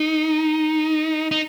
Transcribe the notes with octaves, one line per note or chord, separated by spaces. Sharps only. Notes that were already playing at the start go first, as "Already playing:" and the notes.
Already playing: D#4
D#4